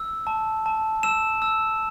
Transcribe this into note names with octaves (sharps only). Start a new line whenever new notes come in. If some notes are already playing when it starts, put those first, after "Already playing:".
Already playing: E6
A5
A5
E6 E7
E6